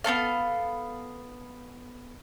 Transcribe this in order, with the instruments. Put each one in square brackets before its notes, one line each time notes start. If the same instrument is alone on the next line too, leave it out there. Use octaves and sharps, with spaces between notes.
[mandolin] B3 C4 A4 F5